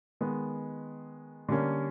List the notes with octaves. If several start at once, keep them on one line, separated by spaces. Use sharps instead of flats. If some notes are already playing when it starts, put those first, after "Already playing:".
D#3 G#3 B3
D3 G3 A#3 C#4